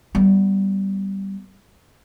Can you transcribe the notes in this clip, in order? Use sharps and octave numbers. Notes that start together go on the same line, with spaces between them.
G3 B3